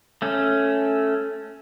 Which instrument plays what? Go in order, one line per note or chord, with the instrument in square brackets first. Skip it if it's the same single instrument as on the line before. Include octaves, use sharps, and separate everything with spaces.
[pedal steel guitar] A3 C#4